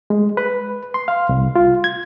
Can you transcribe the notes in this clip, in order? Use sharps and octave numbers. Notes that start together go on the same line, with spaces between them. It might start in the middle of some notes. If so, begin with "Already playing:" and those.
G#3
B4
C6
F5
C2
F4
G#6